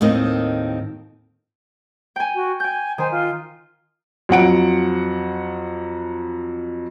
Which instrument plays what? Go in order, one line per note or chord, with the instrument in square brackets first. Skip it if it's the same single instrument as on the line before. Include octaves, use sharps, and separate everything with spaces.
[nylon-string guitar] D#2 A2 D#3 C4 D#5
[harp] G5 G#5
[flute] F#4
[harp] G5 G6 [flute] G#5
[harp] D#3 G#5 [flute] C5
[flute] F4
[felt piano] F2 F#3 F#5 D7